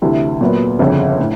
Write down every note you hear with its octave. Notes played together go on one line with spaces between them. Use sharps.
D2 C3 E3
A#2 F#3 B3
G1 F2 C#3
A2